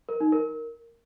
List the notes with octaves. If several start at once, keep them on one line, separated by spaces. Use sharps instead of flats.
A#4
D#4
A#4